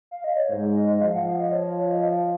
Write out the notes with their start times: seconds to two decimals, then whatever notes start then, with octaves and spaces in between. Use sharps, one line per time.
0.11 F5
0.24 D#5
0.36 C#5
0.50 G#2 C5
0.75 D#5
0.91 D#5
1.01 F3 F5
1.14 F#5
1.27 F5
1.40 D#5
1.52 C#5
1.78 C#5
1.91 D#5
2.03 F5